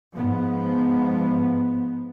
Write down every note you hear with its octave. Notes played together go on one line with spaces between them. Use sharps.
G#2 F3 B3